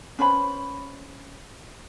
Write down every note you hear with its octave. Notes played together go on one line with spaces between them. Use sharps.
C#4 B4 C5 B5